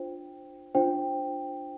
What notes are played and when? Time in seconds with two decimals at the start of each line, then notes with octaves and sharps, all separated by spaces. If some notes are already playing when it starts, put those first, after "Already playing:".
Already playing: D4 F4 C5 G5
0.75 D4 F4 C5 G5